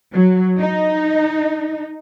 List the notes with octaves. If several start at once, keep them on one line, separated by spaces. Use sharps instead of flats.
F#3
D#4